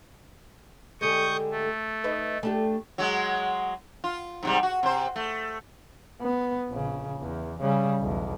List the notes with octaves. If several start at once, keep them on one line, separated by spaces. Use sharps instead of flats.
D3 G3 G#3 C#6 D#6 G6
A3
D#4 B4 E5
A3 D4 G4
F#3 G#3
F4
G#2 C3 G3
F#4
C3 C5
A3
B3
A#1 C#3
E2
C#3 G3
B1 E2